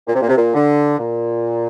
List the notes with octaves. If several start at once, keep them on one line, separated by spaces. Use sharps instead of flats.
A#2
C3
A#2
C3
A#2
D3
A#2